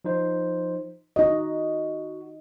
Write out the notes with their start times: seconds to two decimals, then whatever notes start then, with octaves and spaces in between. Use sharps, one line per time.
0.05 F3 D#4 C5
1.16 D#4 F#4 D#5